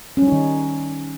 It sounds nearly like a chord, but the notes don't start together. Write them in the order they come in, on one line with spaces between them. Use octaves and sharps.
C#4 G3 D#4 D#3